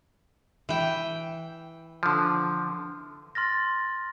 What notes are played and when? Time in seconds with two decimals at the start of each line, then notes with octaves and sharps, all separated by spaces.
0.69 E3 G5
2.03 D3 F3
3.35 C6 F6 A6 A#6